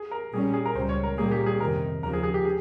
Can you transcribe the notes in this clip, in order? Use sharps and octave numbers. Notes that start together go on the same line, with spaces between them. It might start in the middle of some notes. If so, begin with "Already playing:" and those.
Already playing: G#4
A#4
A#2 G3 C#4 G#4
G#4
A#4
C#2 C#3 G3 C5
C#5
A#4
A#2 G3 A#3 G#4
G4
G#4
F2 C3 D#3 A#4
D#2 C#3 F3 A#4
G#4
G#4
G4
G#4